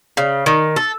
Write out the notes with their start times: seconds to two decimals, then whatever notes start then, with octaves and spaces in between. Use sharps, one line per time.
0.17 C#3
0.46 D#3
0.76 A4